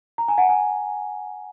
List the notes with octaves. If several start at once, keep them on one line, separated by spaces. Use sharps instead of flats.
A#5
G#5
F#5
G#5